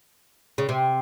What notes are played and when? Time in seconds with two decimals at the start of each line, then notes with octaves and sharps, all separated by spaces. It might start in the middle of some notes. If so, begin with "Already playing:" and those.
0.58 C#3
0.69 C3